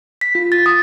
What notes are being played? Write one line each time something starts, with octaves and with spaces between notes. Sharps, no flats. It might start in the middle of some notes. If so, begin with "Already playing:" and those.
B6
F4
A6
D#6